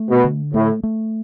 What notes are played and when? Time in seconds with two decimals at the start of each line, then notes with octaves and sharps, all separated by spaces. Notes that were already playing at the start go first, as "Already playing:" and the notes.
Already playing: A3
0.09 B2
0.24 D3
0.54 A2 A3
0.83 A3